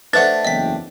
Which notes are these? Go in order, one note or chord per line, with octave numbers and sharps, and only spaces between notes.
A3 D4 B4 C5 F#5 A6
F#1 E2 D#5 G5 B6